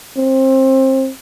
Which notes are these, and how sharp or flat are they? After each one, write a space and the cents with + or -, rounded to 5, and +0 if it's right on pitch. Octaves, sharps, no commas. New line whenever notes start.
C4 +25